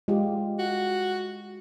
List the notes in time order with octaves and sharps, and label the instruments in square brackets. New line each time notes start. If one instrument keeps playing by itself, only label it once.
[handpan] G#3 F4 G4
[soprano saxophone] F#4